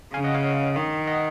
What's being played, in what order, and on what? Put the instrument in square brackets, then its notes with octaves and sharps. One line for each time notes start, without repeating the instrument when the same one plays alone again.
[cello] C#3 [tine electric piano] F5 G#5
[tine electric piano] D#5 F#5
C#5 F5
[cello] D#3
[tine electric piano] D#5 F#5